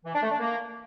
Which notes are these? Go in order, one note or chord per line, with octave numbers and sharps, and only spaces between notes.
E3
D4
A3
D4
A#3